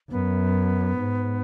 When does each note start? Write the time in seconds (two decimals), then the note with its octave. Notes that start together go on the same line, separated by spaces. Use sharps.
0.10 F#2 B3
0.98 G#2